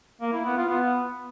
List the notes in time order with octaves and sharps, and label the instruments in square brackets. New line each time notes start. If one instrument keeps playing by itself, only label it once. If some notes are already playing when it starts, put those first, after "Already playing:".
[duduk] A#3
E4
B3
F4
B3